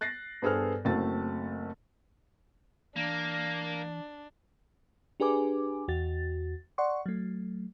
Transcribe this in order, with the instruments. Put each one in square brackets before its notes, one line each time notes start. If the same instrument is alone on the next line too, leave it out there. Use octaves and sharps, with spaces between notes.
[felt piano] F#6 A6 A#6 C7
G2 B3 G#4 A4 C5 F6
F#1 A3 C4 F#4 A5 A6
[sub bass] E3 [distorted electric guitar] A#3 [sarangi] D4
[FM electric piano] D4 G4 G#4 B4 G#5 D6
E2 F#4 A6
D5 F#5 C6 C#6
F#3 A3